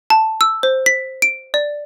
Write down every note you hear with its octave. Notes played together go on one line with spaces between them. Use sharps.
A5
E6
C5
B6
D7
D5